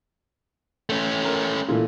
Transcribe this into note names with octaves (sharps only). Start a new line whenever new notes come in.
A3 C#4
A#4
A#2 E3 A3